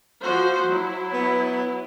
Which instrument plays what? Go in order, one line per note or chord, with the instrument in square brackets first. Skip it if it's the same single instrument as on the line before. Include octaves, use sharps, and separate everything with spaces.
[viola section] F3 F#4 C5
F#3 E4
[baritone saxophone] B3